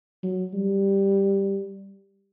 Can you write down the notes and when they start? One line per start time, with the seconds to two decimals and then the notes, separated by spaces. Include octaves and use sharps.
0.23 F#3
0.53 G3